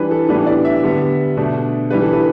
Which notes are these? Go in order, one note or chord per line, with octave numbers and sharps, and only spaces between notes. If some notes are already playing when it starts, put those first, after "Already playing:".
Already playing: E3 G3 D4 B4
A4
A2 E3 G3 B3 D4 B4
D5
E5
D3 G3 B3
B2 A3 D4
E3 G3 D4 B4
A4
B4